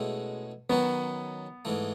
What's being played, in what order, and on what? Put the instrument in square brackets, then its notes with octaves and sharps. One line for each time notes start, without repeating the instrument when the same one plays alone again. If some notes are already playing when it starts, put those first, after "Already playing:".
Already playing: [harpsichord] B2 A3 C#4 E4 [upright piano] G#3
[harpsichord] D#3 F#3 C#4 F#4 [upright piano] B3
[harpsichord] G#2 E3 A3